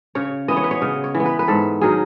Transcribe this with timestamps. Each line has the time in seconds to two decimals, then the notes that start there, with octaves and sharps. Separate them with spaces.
0.15 C#3 C#5
0.48 E3 B3 D#5
0.57 C#5
0.64 B4
0.71 C#5
0.82 C#3 D#5
1.04 C#5
1.15 E3
1.20 B3
1.26 B4
1.39 B4
1.48 G#2 A4
1.81 D#3 F#3 C#4 G#4